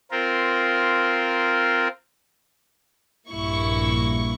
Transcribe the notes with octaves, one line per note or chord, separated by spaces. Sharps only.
C4 F4 A#4
A#1 G2 A#3 E4 C#6